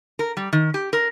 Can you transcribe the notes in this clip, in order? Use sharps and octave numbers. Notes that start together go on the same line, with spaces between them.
A#4
G3
D#3
G4
A#4